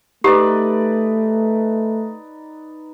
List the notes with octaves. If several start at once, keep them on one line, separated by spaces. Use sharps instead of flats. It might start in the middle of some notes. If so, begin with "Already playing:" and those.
A3 D#4 G4 B4 D5